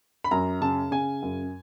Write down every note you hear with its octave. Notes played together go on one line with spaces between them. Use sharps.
B5
F#2 A#5
C#3 A5
C#3 G#5
F#2